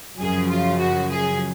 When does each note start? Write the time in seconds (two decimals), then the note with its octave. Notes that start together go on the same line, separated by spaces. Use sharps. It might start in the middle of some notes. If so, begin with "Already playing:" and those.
0.19 F#2 C#3 F3 G#4
0.50 F4
0.80 F#4
1.10 G#4